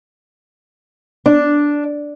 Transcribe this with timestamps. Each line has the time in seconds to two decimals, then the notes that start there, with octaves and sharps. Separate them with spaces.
1.26 D4